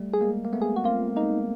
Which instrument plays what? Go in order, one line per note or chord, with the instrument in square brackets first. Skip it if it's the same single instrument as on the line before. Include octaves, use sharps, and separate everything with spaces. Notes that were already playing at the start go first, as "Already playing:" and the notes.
Already playing: [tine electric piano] G3 A3
[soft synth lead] G#4
[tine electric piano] G#3 A#3
A#3
A3 B3
[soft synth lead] G#4
F#4
[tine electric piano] A#3 C4 [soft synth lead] F4
[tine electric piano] G#3 A#3 [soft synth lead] D#4